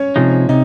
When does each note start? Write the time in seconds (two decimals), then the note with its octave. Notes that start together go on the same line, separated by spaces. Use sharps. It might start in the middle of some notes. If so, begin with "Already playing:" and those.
Already playing: C#4 C#5
0.16 C3 F3 G#3 D#4
0.49 C3 D#4